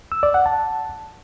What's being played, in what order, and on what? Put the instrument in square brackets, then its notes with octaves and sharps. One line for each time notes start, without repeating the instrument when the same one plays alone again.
[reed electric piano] E6
D5
F#5
A5